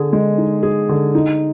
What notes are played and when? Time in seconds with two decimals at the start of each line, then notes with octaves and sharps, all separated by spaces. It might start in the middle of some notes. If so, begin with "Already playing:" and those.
Already playing: D3 G#4
0.13 G#3
0.38 D#4
0.63 G#4
0.89 D3
1.15 D#4